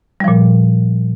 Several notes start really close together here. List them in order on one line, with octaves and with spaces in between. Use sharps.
G3 F3 A#2